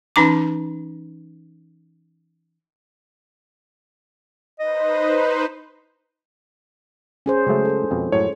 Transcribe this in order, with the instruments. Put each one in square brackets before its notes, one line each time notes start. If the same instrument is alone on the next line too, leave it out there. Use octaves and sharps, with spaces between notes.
[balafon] E3 C#4 D#4 A#5 D6
[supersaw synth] D#4 B4 C5 [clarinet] D#5
[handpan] C#4 G#4 C5
[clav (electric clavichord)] C#3 F#3 A3 [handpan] G#3
[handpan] G#4 A4
[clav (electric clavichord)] F2 B2
[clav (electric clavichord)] F#2 A2 [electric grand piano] C#5